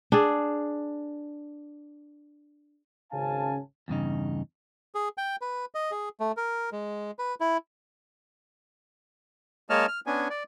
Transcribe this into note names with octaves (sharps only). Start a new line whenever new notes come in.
D4 G#4
G#1 C#3 C#4 F5 G#5 A5
E2 G2 C#3 D#4
G#4
G5
B4
D#5
G#4
A3
A#4
G#3
B4
E4
G#3 A#3 C#5 D#5 A5 F6
F6
B3 C#4 D4 G#5
D5